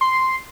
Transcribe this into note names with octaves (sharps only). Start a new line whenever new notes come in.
C6